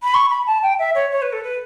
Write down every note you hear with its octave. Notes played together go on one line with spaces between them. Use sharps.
B5
C#6
B5
A5
G5
E5
C#5
C#5
B4
A4
B4